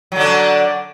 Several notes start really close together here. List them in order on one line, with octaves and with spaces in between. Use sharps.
F#3 D3 D4